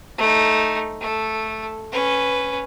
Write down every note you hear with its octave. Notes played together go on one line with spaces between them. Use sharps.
A3 D#4
A3 A4
C#4 B4